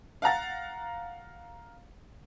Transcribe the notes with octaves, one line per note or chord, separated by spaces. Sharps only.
F5 F#5 A#5 A6